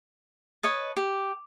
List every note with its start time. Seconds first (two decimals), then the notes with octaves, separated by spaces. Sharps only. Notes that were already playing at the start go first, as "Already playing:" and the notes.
0.63 B4 C#5 D#5 A5
0.97 G4